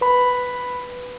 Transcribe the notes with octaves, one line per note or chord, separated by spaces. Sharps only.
B4 B5